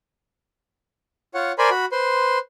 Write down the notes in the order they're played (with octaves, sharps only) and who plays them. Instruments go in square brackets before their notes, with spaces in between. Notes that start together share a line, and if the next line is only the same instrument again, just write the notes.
[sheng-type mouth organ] F4 C#5 F#5
A#4 C5 D5 G#5 B5 C6
F#4 B5
B4 C5 C6